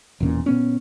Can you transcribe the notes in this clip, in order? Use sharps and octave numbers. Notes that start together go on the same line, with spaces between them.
E1 E2 A#2 C#4
A#2 B3 C#4